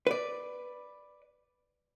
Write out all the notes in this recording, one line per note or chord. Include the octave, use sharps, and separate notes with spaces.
B4 D5